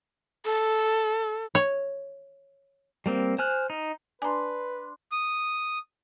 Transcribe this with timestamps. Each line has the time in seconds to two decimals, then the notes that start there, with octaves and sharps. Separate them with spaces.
0.45 A4
1.55 C#5
3.06 G3 A#3 C4
3.38 C5 G#5 F6 F#6
3.70 D#4
4.22 D4 B4 G#5 A#5 C6
5.12 D#6